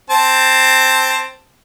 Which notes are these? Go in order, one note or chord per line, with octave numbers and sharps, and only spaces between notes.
C4 A5